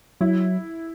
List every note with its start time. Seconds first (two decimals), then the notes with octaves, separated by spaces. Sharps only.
0.21 F#3 E4